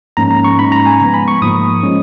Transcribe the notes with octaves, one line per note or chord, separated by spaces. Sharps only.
G#2 F3 A#3 C#4 A#5
A#5
C#6
G#2 F#3 C#4 B5
A#5
G#5
C#3 F3 G#3 B3 A#5
B5
C#6
G#2 F3 A#3 D#6
F3 G#3 C#4